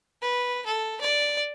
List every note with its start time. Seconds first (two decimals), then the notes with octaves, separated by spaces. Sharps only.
0.22 B4
0.66 A4
1.01 D5